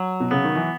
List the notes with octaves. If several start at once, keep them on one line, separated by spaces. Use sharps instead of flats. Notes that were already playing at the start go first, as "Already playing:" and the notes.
Already playing: F#3
B2
C#3 B3
D#3
E3